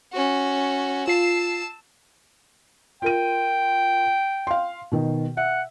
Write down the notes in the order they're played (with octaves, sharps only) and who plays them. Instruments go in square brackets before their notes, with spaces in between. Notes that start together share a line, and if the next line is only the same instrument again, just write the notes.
[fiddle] C#4 F#4
[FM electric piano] F4 C7 [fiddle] A5 E6
[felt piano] F4 A#4 D#7 [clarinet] G5
[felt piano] F5 C6
B2 D#3
[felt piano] E5 [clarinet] F#5